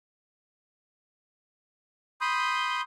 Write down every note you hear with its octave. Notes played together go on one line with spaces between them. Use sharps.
B5 C6 D#6 G6